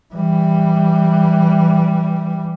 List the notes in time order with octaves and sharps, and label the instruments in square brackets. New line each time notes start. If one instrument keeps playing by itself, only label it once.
[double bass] E3 G3